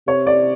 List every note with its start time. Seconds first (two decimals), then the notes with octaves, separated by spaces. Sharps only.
0.08 C3 C#5
0.27 D5